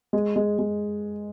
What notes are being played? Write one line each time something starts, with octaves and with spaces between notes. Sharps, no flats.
G#3
G#3
G#3